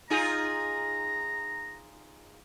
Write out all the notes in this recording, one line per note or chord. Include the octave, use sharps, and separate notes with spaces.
D#4 F4 G#4 A#5